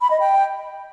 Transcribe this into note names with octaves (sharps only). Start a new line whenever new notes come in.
B5
D#5
G5